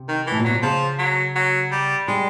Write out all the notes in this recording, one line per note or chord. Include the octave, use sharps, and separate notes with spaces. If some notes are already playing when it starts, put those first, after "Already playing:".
Already playing: C3
D#3
A2 E3
A#2
B2 F#3
C3
C#3 F3
F#3
F#3
G3
G3 G#3